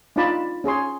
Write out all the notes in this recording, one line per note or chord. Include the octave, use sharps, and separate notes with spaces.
D4 D#4 F4 D5 A5 B5
C#4 G#4 C#5 C6